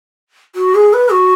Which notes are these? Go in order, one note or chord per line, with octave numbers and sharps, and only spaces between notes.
F#4
G#4
B4
F#4